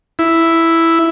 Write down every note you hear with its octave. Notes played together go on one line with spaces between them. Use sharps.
E4